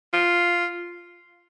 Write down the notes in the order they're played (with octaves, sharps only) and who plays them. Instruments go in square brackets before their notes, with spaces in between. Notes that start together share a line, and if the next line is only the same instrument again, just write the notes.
[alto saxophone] F4